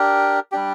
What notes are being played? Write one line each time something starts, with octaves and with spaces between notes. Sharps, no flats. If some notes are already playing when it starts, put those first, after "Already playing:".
Already playing: D4 G4 A#4
G3 D4 G4